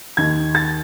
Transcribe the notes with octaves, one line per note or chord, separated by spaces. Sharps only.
D#2 D#3 G#6
A6